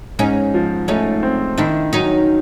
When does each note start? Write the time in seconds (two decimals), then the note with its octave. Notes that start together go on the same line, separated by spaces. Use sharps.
0.19 G#2 C#4 D#4
0.54 F3
0.88 A3 C#4 D#4
1.23 C4
1.58 D#3 D4 E4
1.93 F#3 C#4 D#4